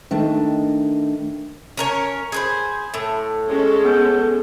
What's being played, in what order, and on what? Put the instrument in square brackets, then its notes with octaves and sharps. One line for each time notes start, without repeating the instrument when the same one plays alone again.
[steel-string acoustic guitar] D#3 A3 D4 D#5
[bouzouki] C#4 A#4 C#5
[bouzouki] G#4 B4 C5 [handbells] B5 G#6
[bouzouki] A2
[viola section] G#3 C#4 A4 [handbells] C#5
[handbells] B3 F6 G6